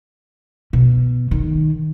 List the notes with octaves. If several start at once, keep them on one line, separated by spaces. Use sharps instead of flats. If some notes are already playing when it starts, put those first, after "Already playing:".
B2
D#3